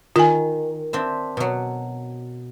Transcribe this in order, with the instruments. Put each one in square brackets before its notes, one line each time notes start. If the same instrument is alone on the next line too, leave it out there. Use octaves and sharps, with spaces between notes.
[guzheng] D#3 [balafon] F4 G#5
[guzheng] C4 D4 E5
B2 F#3